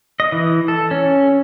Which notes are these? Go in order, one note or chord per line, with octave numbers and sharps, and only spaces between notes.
D#5
E3
A4
C#4